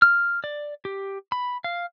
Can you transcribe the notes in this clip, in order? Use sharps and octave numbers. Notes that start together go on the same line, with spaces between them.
F6
D5
G4
B5
F5